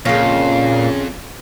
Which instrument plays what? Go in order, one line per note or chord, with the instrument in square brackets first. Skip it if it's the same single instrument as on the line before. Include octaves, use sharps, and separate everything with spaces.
[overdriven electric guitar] F2 [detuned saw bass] A#2 [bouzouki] C#3 C#4 [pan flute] F5